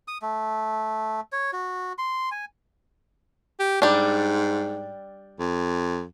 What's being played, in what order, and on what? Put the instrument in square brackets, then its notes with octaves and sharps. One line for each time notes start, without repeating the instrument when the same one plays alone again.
[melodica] D#6
A3
C#5
F#4
C6
G#5
[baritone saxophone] G4
[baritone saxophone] G#2 [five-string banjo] G3 D4
[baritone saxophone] F2